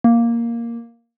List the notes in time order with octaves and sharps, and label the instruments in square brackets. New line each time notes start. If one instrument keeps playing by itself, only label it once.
[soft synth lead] A#3